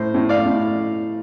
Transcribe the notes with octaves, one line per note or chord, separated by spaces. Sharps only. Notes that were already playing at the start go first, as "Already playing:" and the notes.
Already playing: A2 C5
A2
D5 F5
A2